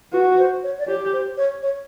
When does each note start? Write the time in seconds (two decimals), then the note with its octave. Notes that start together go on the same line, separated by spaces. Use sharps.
0.13 F#4 B4
0.38 C5
0.63 C#5
0.79 D5
0.88 G4 C#5
1.13 C5
1.37 C#5
1.63 C#5